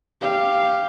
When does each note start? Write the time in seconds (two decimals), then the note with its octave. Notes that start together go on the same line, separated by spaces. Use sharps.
0.21 G4 F5